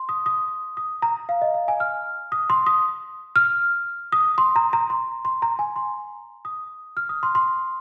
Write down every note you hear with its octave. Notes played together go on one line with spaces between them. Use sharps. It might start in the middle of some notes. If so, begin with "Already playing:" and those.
Already playing: C6
D#6
D#6
D#6
A#5
F5
D#5
F5
G#5
F6
D#6
C6
D#6
F6
D#6
C6
A#5
A#5
C6
C6
A#5
G#5
C6
D#6
F6
D#6
C6
C6